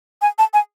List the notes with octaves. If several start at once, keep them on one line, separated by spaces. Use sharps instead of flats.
G#5
A5
G#5